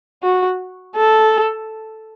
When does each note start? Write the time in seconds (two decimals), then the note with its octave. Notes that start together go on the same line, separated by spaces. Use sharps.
0.23 F#4
0.96 A4